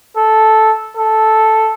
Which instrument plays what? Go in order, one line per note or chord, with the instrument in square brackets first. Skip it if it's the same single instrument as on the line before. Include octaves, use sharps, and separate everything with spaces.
[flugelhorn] A4
A4